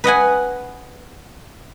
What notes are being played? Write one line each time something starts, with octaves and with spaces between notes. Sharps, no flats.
B4 D#5 F#5 G#5